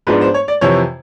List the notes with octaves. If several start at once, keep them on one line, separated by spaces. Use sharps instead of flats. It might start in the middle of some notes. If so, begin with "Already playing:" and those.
G#2 F3 G#3 B3 D4 B4
C5
C#5
D5
F2 C3 E3 C#5